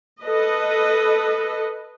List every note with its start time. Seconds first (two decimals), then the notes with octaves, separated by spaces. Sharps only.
0.23 A4 B4 D#5